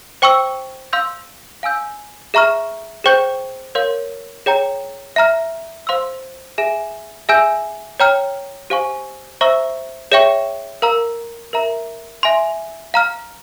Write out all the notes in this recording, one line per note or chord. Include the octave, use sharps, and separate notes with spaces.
C5 G5 C#6 E6
F5 C6 E6 G6
F5 G#5 E6 G6
G#4 E5 A#5 C#6 F6
G#4 C5 G5 C#6 G6
A#4 C#5 F5 C6 G6
G#4 C#5 G5 A#5
E5 A#5 F6
C5 F5 C6 E6
G#4 E5 G#5
G#4 E5 G#5 E6 G6
C#5 G5 A#5 F6
G4 C5 F5 G#5 C#6
C5 E5 A#5 C#6 E6
G#4 C#5 E5 G5 C#6
A#4 F5 A#5 E6
A#4 E5 A#5
E5 G#5 C6
F5 A#5 F6